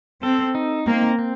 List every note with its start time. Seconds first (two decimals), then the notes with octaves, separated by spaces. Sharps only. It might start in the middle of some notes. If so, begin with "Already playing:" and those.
0.23 C4 A4
0.55 D#4
0.87 A#3 C4
1.19 C4